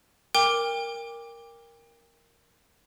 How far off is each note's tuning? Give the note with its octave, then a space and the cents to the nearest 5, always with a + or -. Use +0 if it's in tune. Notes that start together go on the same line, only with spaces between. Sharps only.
A#4 +0 G5 +35 D6 +0